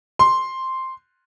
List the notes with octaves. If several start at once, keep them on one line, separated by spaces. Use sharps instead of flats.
C6